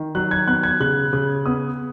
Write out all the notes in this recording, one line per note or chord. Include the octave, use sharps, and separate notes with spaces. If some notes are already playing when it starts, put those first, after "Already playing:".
Already playing: D#3
F#3 F#6
G#6
B3 F#6
G#6
C#3 F#6
C#3
B3 D#6